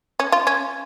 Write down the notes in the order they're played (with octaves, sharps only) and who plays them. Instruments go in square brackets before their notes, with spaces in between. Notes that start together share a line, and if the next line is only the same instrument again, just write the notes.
[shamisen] C#4
F4
C#4